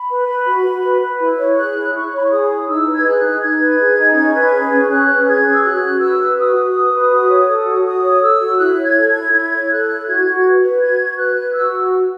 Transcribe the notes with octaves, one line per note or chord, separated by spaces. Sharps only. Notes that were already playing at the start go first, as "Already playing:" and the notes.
Already playing: B5
B4
B4
F#4
F#4
B4
B4
E4
C#5
G#4 F#6
E4
E4 C#6
C#5 B5
C#6
G#4 D#6
E4
D#4 E6
B4
G#6
G#4 F#6
D#4
D#4 G#6
B4
G#4
D#4
C#4
B4
G#4
C#4
C#4 F#6
B4
G#4 G#6
C#4
E6
F#4 F#6
F#4
B4 E6
B4
F#4 D#6
F#4
B4
B4
F#4
C#5
A4
F#4
F#4 D#6
C#5
A4 E6
F#4
E4 F#6
C#5
G#6
A4
G#6
E4
E4 G#6
C#5
A4 F#6
E4
F#4 G#6
F#4
B4
B4
F#4 G#6
F#4
B4 F#6
B4
F#4 E6